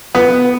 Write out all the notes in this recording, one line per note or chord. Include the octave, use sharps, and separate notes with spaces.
B3